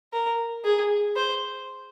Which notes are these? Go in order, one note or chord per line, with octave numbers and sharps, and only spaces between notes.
A#4
G#4
C5